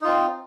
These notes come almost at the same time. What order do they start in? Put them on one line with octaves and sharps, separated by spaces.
D#4 F4 C4